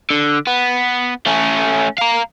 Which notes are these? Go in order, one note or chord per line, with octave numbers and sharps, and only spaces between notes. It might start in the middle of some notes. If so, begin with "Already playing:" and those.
D3
B3
A3 C#4
F5 A#5